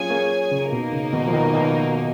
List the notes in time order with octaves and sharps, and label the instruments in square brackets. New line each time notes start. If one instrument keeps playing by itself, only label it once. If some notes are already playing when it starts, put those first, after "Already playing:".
Already playing: [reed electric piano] F#3 A#3 C#4 F4 [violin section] G#4 C#5 G#5
[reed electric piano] A#3 C#4
C#3
[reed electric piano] B2 [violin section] A#3 D#4 A#4
[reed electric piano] C#3
B2 D#3
F3
B2 D#3
B2 D#3